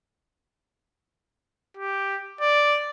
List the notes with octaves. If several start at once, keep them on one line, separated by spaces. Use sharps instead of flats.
G4
D5